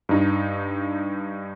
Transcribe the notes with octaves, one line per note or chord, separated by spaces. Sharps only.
G2 D#4